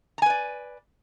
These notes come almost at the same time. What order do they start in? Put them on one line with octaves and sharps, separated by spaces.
A#5 G#5 B4 D5